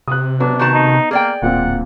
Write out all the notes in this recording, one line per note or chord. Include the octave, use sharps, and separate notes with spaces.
C3 D#6 F#6
F#3 B3 D4
D#3 F#4 A5
D#4
A#3 G#4 D5 G5
D1 A#2 A#3 C4 F#5